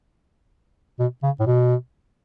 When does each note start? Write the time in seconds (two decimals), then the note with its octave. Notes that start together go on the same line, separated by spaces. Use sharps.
0.99 B2
1.23 C#3
1.40 A2
1.47 B2